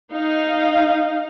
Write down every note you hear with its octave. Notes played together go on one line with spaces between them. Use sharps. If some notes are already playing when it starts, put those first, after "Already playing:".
D#4 F5